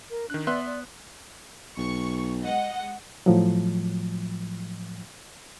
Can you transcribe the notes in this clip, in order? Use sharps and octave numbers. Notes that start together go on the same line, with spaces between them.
A#4
D#3 D4 F#6
B3 D5 E5 C6 F#6
D5
B1 C#6
G#3 D#5 F#5
A2 F3 F#3